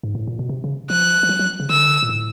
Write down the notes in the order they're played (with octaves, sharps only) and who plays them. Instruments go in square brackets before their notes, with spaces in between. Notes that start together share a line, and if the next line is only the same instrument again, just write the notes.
[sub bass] G#2
A2
A#2
B2
C3
C#3
[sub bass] F3 [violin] F#6
[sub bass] F3
F#3
F#3
C#3
[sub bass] D3 [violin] E6
[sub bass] A#2
A2